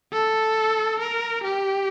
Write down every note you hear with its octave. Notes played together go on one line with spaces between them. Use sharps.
A4
A#4
G4